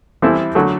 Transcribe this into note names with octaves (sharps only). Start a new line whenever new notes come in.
E3 G3 C4 E4 A4
D3 F#3 A3